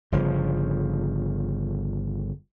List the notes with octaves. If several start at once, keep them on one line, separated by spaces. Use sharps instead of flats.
G1 C#3 F3